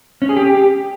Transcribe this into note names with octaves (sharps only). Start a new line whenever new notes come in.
C#4
G#4
G4